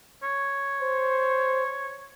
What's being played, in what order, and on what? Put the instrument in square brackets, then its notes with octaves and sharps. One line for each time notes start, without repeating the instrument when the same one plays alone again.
[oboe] C#5
[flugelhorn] C5